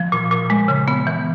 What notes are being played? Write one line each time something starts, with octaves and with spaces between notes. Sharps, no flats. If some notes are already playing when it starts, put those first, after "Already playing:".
Already playing: F3
A#2
A#2
G#3
C#3
B3
E3